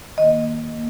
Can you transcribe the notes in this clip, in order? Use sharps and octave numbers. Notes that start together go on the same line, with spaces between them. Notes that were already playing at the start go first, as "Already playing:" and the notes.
D#3 A#3 D#5
A#3